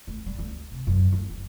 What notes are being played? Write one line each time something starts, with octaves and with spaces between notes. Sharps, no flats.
A3
G3
D2
C3
F#2
D2
F#1